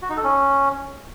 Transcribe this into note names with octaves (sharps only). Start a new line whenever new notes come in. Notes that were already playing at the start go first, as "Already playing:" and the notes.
F#4
D#4
A4
C#4